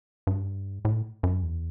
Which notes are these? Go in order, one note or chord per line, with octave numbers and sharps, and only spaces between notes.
G2
A2
F#2
E2